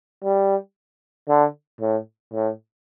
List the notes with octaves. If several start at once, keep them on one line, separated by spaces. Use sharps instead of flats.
G3
D3
A2
A2